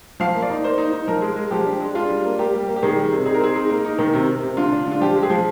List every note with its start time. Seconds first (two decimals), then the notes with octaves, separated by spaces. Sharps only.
0.20 F3 F5
0.35 A#3
0.43 D5
0.50 D#4
0.64 A#3 C5
0.78 D#4
0.92 D#4
1.08 F3 A#4
1.22 G#3
1.36 G#3
1.51 F3 G4
1.65 D4
1.80 G#3
1.95 D4 F4
2.09 G3
2.25 A#3
2.39 A#3 G4
2.54 G3
2.68 A#3
2.76 G4
2.83 D#3 G#4
2.96 G3
3.12 C3
3.26 D#4 G#4
3.34 A#4
3.40 C4 G#4
3.55 D#4
3.70 A#3 A#4
3.85 D#4
3.98 D#3
4.14 C3
4.28 C3
4.43 C3
4.57 D3 F4
4.72 D4
4.87 D3
4.92 F4
5.01 F3 G4
5.15 G#3
5.23 G#4
5.30 F3